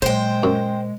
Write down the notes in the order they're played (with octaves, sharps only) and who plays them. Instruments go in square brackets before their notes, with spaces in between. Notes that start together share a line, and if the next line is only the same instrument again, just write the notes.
[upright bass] A#2 F#3 [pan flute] G#3 [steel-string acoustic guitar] C5 G5
[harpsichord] F#2